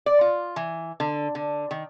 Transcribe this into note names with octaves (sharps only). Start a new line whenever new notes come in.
D5
F4
E3
D3
D3
D#3